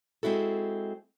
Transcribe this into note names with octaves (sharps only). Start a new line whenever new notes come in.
G#3 C4 E4 F#4 A4